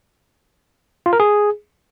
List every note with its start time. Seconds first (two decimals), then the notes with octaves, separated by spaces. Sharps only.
1.06 F4
1.13 A#4
1.20 G#4